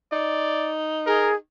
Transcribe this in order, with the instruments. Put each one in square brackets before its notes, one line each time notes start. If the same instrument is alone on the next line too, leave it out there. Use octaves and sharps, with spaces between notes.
[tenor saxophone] D#4 [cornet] D5
[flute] G#4 [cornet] A#4